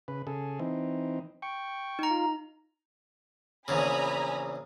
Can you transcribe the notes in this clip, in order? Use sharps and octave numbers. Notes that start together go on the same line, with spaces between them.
C#3 B4
C#3 G#4 A4
E3 C4 D#4
G5 C#6
D#4 A#5
F4
A#1 E2 C#3 G#5 A#5 B5